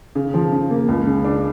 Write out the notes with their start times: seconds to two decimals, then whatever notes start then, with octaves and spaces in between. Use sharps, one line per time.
0.15 C#3
0.34 F3
0.52 C#3
0.70 A#3
0.88 C#2
1.07 C#3
1.25 D4